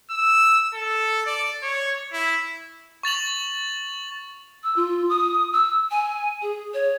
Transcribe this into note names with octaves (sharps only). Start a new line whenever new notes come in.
E6
A4
D5
C#5
E4
C#6 A6 F7 F#7
E6
F4
D#6
E6
G#5
G#4
C#5